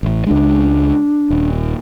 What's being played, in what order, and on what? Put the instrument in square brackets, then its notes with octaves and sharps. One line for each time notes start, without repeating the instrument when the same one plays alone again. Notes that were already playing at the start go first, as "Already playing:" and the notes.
[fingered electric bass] A1 A2
[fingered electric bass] C#2 G#3 [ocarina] D4
[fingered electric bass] D#1